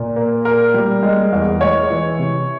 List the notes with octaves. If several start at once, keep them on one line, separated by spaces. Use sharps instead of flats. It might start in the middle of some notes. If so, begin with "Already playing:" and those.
Already playing: A#2
A#3
A#3 A#4
G3
G#3
E2
G#3 C#5
E3
C3